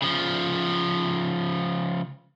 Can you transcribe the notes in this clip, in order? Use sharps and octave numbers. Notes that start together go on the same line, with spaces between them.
C#3 F3